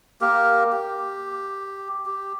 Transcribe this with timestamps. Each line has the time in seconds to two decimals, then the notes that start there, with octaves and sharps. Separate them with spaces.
0.21 A#3 G4 A#4
0.72 G4
2.06 G4